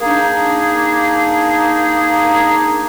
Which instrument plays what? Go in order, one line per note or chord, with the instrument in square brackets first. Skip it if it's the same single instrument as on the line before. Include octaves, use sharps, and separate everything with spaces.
[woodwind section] A#3 D4 D#4 G#4